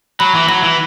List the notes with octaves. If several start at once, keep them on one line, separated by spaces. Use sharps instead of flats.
F#3 B5
E3
F#3 B5
E3